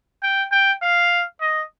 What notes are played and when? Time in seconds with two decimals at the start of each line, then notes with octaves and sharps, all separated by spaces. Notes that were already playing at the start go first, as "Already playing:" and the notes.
0.23 G5
0.51 G5
0.82 F5
1.41 D#5